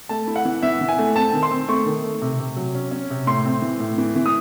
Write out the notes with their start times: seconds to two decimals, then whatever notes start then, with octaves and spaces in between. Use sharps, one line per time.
0.09 A3 A5
0.27 E4
0.36 F#5
0.45 E3
0.63 E3 E5
0.81 E3
0.89 G#5
0.98 A3
1.16 C4 A5
1.33 D#3
1.43 C6
1.51 C4
1.68 A3 C#6
1.86 D#3
2.04 A3
2.22 C3
2.40 C3
2.56 F#3
2.75 C#4
2.91 C#4
3.10 C3
3.27 A2 C6
3.45 C4
3.62 E3
3.80 A2
3.98 E3
4.16 E3
4.26 D#6